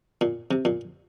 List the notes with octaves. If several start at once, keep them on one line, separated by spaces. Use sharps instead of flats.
A#2
C3
A#2